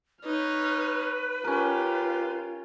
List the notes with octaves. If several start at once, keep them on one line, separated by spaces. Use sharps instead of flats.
D#4 B4 C#5 F6
C#4 F4 G4 A#4